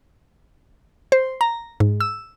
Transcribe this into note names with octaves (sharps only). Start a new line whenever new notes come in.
C5
A#5
G#2
E6